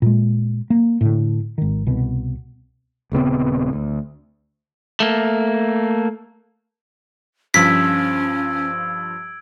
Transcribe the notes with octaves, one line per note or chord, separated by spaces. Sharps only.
A#2 G#3
A#3
A2 D3
G#1 D#3
C2 B2
D#1 C#3 B3 C4
D2
A3 A#3
G2 F3 C#4 E6 G#6 B6 D7